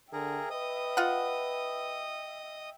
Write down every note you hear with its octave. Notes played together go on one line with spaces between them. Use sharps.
D3 G#4 A#4 E5 G5
B4 D#5 D#6
F4 F#5